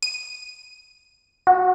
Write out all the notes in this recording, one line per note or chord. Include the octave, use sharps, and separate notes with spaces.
D#7
F#4